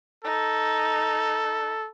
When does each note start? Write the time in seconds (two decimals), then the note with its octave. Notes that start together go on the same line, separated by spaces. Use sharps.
0.24 D#4 A4